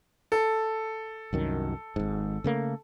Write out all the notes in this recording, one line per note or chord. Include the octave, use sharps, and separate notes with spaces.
A4
C2 F#2 D#3
G#1 G#2
C#3 A3 A#3